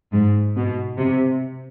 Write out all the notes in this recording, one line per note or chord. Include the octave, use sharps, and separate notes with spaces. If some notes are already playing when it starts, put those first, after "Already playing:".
G#2
B2
C3